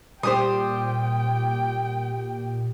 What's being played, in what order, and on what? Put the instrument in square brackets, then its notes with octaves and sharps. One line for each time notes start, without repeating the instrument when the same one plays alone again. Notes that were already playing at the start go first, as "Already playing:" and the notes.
[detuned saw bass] A#2 [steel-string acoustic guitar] G3 C5 [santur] G4 D#6 [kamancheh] G5